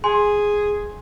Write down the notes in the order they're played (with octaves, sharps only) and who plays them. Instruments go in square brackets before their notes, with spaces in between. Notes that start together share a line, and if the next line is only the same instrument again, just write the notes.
[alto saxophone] G#4 [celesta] G#5 C6